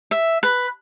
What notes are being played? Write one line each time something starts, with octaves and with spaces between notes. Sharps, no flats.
E5
B4